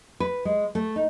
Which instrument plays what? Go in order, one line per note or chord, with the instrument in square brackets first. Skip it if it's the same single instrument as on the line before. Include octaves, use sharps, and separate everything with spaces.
[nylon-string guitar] B4
G#3
A3
D#4